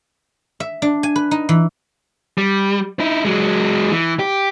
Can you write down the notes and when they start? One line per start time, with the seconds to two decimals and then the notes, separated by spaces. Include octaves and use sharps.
0.60 E5
0.82 D4
1.03 G#5
1.16 B4
1.31 D#4
1.49 E3
2.38 G3
3.00 D#4 E4
3.25 F#3 G#3
3.91 E3
4.19 G4